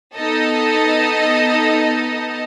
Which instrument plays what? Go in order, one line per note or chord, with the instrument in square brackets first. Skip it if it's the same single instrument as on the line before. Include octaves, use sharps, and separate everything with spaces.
[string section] B3 D#4 A4 D#5